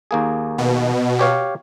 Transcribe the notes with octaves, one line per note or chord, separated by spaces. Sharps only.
D#2 A#3 G#4
B2
G4 C#5 F5